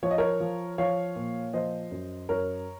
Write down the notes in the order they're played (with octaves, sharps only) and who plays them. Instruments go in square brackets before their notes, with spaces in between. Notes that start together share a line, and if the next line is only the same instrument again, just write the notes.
[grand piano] F3 C#5
D#5
A#4 C#5
F3
F3 C#5 F5
A#2
F3 C5 D#5
F#2
F#2 A#4 C#5